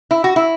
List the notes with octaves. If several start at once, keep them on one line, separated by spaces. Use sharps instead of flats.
E4
F#4
E4